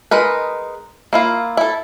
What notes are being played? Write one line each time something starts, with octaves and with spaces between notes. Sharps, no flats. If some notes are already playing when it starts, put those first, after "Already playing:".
G#3 D#4 A#4 B4
A#3 E4 F4
E4 A4